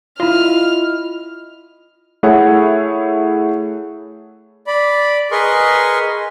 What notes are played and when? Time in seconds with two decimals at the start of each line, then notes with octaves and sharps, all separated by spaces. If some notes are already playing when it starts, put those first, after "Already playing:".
0.20 E4 F4 D#5 F6
2.23 A3 E4 G#4 C#5 F#5
4.67 D5 B5
5.31 G#4 A#4 B4 D#5 C6 C#6